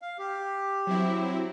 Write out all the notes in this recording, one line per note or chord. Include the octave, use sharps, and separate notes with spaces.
F5
G4
F#3 C4 E4